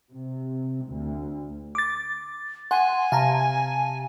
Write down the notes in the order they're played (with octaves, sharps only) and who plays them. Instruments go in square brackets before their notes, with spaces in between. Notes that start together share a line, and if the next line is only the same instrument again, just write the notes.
[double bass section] C3
D2
[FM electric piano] D6 A6
[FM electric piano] F#5 [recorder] G#5 [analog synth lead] C6
[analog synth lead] C3 [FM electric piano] F5 A5 A#5